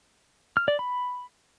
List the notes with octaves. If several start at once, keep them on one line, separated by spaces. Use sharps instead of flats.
F6
D5
B5